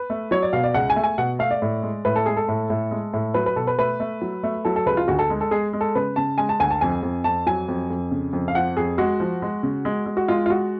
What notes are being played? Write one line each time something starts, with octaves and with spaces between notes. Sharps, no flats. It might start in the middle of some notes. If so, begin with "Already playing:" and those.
Already playing: B4
A3
F#3 C#5
D5
B2 F5
D5
C#2 F#5
G#5
A3
G#5
B2 F#5
A3 F5
D5
A2
G#3
A2 B4
A4
G#3 G#4
A4
A2
A2
G#3
A2
F#3 B4
B4
B2 A4
B4
A3 B4
A3
F#3
A3
F#3 A4
A4
C#2 B4
F4
D2 F#4
A4
G#3
A4
G#3 G#4
G#3
A4
C#3 B4
C#3 A5
G#3 G#5
A5
D2 G#5
A5
F2 G#5
F2
F2 A5
F#3 G#5
F2
F2
C#3
F2
F5
F3 F#5
F2 G#4
G#3 F#4
F3
G#3
C#3
G#3
G#3
F#4
G#3 F4
F4
G#3 F#4